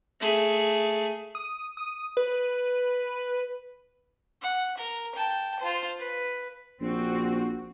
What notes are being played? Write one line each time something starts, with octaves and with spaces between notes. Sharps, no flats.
A3 G#4
D#6
D#6
B4
F#5
A#4
G5 A5
F4 C5
B4
A#1 C4 F#4